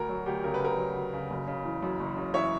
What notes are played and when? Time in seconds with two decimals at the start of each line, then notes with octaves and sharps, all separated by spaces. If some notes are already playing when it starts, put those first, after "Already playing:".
Already playing: D2 A#4
0.09 F#3
0.26 D2 G4
0.44 C#3 A#4
0.54 B4
0.61 D2 A#4
0.78 F#3
0.96 D2
1.13 C#3
1.30 F#1
1.47 C#3
1.65 E3
1.82 F#2
1.99 F#1
2.17 C#3
2.34 E3 C#5 E5